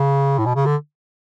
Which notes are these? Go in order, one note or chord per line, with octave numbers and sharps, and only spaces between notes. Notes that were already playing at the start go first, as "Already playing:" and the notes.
Already playing: C#3
A2
B2
C#3
D3